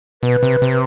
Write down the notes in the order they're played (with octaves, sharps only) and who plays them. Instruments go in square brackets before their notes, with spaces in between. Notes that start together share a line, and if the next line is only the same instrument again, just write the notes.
[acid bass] B2 [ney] B4
[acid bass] C3
C3